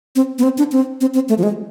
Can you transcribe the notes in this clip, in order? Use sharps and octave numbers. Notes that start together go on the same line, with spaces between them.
C4
B3
C4
D4
C4
C4
C4
A3
F3
G#3